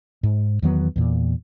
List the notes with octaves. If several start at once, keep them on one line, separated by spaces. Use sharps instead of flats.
G#2
E2 D#3 F#3 B3
E2 A#2